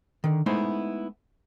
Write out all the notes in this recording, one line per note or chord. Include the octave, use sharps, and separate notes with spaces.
D3 D#3
G#3 A3 B3 D#4 E4 C5